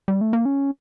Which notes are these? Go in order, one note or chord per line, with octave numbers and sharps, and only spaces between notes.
G3
A3
A#3
C#4